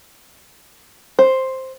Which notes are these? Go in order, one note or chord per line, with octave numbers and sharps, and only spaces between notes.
C5